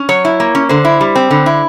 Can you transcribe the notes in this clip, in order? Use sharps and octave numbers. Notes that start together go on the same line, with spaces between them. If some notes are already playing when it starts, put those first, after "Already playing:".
Already playing: C#4
F#3 C#5
E4
A#3
C#4
D3 C5
E4
G3
C4
D3
E4